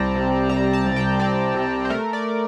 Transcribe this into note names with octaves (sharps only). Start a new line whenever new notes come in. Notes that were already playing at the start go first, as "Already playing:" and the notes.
Already playing: C2 G3 C4 D5 G5 A5 A#5
C3
G3 A#5
A5
C2
G5
C4 D5
C3
C5
A3 A#4
D5